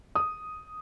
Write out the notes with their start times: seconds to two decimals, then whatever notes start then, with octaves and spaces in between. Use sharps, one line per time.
0.15 D#6